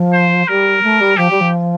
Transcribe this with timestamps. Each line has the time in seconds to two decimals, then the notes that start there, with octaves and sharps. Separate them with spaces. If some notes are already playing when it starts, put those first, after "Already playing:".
Already playing: F3
0.13 C5
0.48 G3 A#4
0.83 A3
1.00 G3
1.17 F3 G4
1.30 G3
1.40 F3